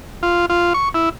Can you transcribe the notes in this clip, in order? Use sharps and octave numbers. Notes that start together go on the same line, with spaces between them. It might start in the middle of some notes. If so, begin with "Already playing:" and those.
F4
F4
C#6
E4